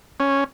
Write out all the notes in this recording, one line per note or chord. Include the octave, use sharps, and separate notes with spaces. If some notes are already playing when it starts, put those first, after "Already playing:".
C#4